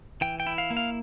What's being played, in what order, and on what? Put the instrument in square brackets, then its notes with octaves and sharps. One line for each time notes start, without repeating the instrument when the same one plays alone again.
[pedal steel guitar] E3 G5
G5
E4
F5
A#3
F5